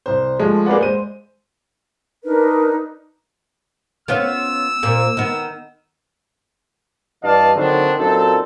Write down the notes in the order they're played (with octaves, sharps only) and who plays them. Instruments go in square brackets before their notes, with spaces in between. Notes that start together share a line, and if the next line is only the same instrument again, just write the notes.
[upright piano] C2 C5
F3 G#3 A3
A#3 G#4 B4 D5 F#5
G#3 C5 D#7
[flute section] D4 D#4 A#4 B4
[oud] B3 C#4 F4 [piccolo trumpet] E6
[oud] A#2 A#3 C4
D#3 B3
[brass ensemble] G2 E3 D5 D#5 F5 A5
D3 D#3 F#3 C4 D4 D#4
F#2 A#2 C4 D#4 A4